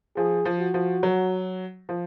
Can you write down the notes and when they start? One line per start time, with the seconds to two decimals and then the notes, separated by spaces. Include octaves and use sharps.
0.16 F3 G#4
0.45 F3
0.59 F#4
0.74 F3
1.03 F#3
1.89 F3